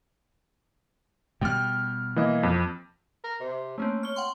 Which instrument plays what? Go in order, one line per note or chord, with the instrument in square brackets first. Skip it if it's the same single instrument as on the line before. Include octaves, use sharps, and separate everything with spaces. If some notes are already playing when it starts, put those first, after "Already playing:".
[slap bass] B2 G3 [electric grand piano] G5 F6
[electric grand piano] E3 A#3 D#5
F2
[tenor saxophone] A#4
C3
[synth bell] A3 A#3 C4 [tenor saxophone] C#4
[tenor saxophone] C#5 [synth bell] F6 G7
[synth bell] F#5 G5 C6